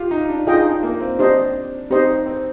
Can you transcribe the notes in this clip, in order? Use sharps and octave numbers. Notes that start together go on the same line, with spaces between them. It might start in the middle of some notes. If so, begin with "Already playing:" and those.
Already playing: F4 G4
D#4
D4
D#4 F4 G#4 D#5 G5
D4
A#3
C4
C4 D4 G4 C5 D#5
C4 D#4 G4 C5 D#5
C4